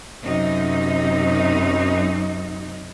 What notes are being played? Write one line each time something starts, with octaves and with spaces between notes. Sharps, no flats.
F#2 C3 D#4